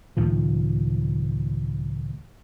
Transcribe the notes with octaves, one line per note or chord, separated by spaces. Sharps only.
C#2 A2 D#3 F3